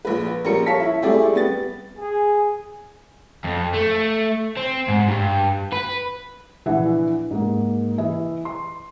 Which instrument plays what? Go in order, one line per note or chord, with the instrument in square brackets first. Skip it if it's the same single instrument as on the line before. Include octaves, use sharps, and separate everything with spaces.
[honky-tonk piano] A#1 B4
A#1 G3 C#4 A#4 C#7
C#5 F5 A5 B6
E4
G3 A3 C4 E4 G#4 D5
G3 B3 A6
[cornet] G#4
[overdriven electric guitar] F2
A3
C4
G#2
G2
B4
[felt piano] A#1 E3 E5 F#5
G#2 A#3
E3 E4 D#5 E5
C6